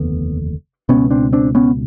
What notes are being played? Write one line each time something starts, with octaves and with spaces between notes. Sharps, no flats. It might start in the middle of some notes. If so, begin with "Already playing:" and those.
Already playing: F1 D#2 D3 B3
C#2 B2 B3 C#4
C4 D4
C4 D4
B3 C#4